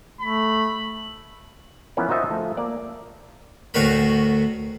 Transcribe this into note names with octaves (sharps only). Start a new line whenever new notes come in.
A3 B5
E3 F3 B3 C#4 A#4 B4
D#4 F4 F#4 C5 D#5 E5
F3 A3
A#3 D5
D2 A2 F#4 A#4 B5